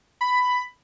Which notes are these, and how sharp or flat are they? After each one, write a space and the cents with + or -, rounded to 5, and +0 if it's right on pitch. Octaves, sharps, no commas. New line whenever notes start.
B5 +10